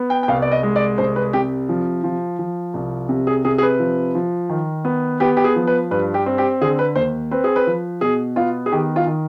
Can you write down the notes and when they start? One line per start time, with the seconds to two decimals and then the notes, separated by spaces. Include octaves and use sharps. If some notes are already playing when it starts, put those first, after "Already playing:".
Already playing: B3
0.10 G5
0.23 G5
0.28 C2 F5
0.42 D5
0.52 D#5
0.63 G#3
0.76 D5
0.98 C2 C5
1.16 B4
1.33 C3 G4
1.69 F3
2.04 F3
2.39 F3
2.74 C2
3.09 C3
3.27 G#4
3.45 C3 G#4
3.58 G#4
3.63 B4
3.79 F3
4.15 F3
4.49 D#3
4.85 B3
5.20 B3 G4
5.37 G4
5.44 G#4
5.56 F3
5.67 B4
5.91 G2 B4
6.14 G4
6.26 C4
6.38 G4
6.61 D3 G#4
6.79 B4
6.96 D#2 C5
7.31 C4 B4
7.44 G#4
7.56 B4
7.67 F3
8.01 B2 G#4
8.36 B3 F4
8.66 G#4
8.72 D#3 G4
8.96 F4
9.06 D#3